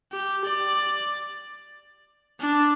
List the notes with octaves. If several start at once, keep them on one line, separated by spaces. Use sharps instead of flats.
G4
D5
D4